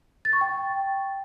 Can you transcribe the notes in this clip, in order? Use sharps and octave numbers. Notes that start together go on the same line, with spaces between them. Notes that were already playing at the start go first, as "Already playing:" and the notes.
A6
C#6
G5